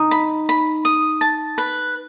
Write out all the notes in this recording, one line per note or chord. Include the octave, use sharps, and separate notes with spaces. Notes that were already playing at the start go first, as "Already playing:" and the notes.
Already playing: D#4
B5
B5
D#6
A5
B4